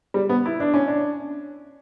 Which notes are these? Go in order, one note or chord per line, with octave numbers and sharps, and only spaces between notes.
G3
B3
E4
D4
C#4
D4